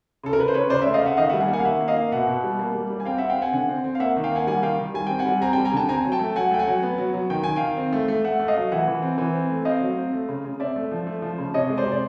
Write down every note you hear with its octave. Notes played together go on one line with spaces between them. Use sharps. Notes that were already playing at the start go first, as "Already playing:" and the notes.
C#3 A4
A#4
C#3 B4
C5
C#3 B4 C#5
C#3 C5 D5
A3 D5 E5
D#5 F5
C#3 E5 F#5
D#3 D#5 F5
G3 E5 F#5
F#5 G#5
A#3
F#5 G#5
F5
D#3 E5 F#5
A#3
D#5 F5
A#3
B2 E5 F#5
B2
G3
A#3
G3
G3
G#5
C4 F5 G5
C4 E5 F#5
F5 G5
C4 F#5 G#5
D3 F#5 G#5
C4
C4
F5
A#3 E5 F#5
D#3
F5 G5
A#3 F#5 G#5
G3 F#5 G#5
D#3 F5 G5
D#3
G3 G#5
C4 G5
F#5 G#5
G3
C4 G#5 A#5
G3 G5 A5
G#5 A#5
D3 G5 A5
C4 G#5 A#5
F#3
G5 A5
A3
F#3 F#5 G#5
A3 G5
F#5 G#5
F#3
B3
F#3
F#3
D#3 G5
D#3 G#5
D#3 F5 G5
C4
A3
A3
A3 E5 F#5
A3
D#5 F5
F#3
E3 E5 F#5
E3
C4
E3
C4
A3
C4 D#5 F5
F#3
C4
A3
C#3
C#3
C4 D5 E5
A3
F3
A3
F3
C#3
C3 C#5 D#5
G#3
C5 D5
C3
D5